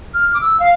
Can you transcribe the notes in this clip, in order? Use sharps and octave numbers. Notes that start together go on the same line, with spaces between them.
F6
D6
E6
F5